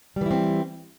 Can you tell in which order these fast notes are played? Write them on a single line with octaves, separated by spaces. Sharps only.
G3 E3 E4 C4